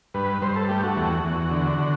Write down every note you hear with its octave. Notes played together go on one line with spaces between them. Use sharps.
G2 B4
G2 C5
A4
A3 G4
F#4
E2
E2
D3
D3